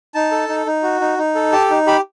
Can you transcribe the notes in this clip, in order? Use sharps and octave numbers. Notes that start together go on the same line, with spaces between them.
D#4 A5
A4
D#4
D#4
F#4
D#4
D#4
A4
G4 A5
D#4
G4 B5